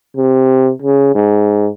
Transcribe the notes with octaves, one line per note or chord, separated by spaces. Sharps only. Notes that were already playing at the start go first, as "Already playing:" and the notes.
C3
C#3
G#2